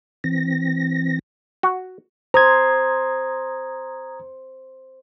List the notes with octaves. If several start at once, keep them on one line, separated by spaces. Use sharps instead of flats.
E3 C4 A#6
F#4
C5 A#5 D#6 G#6